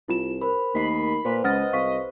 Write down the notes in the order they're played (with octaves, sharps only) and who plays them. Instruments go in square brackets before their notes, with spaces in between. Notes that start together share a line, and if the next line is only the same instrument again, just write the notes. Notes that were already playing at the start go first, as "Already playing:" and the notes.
[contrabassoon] C2 [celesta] E4 F4 E7
[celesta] A#4 [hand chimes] C5 B5
[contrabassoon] D#2 [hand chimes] A3 D#5 C7 [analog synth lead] B5
[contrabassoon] A#2 [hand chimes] B4 C5
[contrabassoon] C#2 [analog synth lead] D#5 [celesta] F#5 F6 A6
[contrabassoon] C2 [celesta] F5 C#6 B6